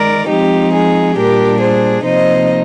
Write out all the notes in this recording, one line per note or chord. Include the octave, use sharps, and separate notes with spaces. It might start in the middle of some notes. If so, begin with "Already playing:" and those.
Already playing: D#3 G#3 A#4 D5
F3 G#3 C4 D#4 G4
G#4
A#2 G3 D4 G4 A#4
G#4 C5
C3 F3 A#3 D#4 C5 D#5